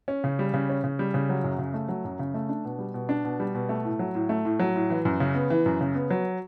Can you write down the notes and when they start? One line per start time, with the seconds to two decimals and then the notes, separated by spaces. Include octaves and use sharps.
0.08 C#4
0.24 C#3
0.39 G3
0.54 C#3
0.69 C#4
0.84 C#3
0.99 G3
1.14 C#3
1.29 F#3
1.44 F#2
1.58 C#3
1.74 A3
1.88 F#3
2.05 F#2
2.19 C#3
2.34 A3
2.49 D4
2.65 B2
2.79 G3
2.94 B2
3.09 D4
3.24 B2
3.40 G3
3.55 B2
3.69 A3
3.85 A2
3.99 F#3
4.15 A2
4.29 A3
4.45 A2
4.59 F#3
4.75 A2
4.90 E3
5.05 F#2
5.20 C#3
5.35 B3
5.50 E3
5.66 F#2
5.81 C#3
5.95 B3
6.10 F#3